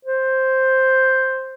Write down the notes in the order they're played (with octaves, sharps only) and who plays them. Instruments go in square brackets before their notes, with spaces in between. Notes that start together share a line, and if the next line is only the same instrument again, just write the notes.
[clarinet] C5